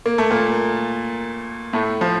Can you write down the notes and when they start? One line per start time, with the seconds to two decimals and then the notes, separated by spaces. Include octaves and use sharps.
0.06 A#3
0.18 A3
0.31 A#2 A#3
1.73 A2 A3
2.01 F3